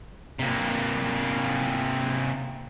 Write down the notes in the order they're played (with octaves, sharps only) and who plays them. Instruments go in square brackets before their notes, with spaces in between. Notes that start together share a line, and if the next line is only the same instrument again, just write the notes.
[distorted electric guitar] C3 A#3